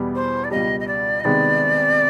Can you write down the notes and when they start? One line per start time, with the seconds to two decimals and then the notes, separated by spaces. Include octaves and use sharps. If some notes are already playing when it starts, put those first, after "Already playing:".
Already playing: E2 B2 G3 B3
0.15 C5
0.44 D5
0.51 C#2 B2 G3 D#5
0.80 D#5
0.87 D5
1.20 D#5
1.24 C3 D#3 G#3 B3 D5